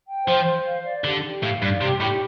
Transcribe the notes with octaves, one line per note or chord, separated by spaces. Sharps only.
G5
F3 C5
C5
F5
D5
D3 G4
G4
A2 F5
G2 D5
C3 G4
A2 G4